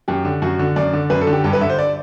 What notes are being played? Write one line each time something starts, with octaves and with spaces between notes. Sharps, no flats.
F#2 G4
D3
F#2 F#4
D3
F#2 D5
D3
F#2 B4
A4
D3
G4
G2 G4
B4
D3 E5
C5
D5